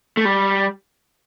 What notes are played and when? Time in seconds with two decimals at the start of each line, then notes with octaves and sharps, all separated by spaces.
0.17 A3
0.25 G3